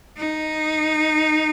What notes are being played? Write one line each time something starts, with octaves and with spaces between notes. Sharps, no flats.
D#4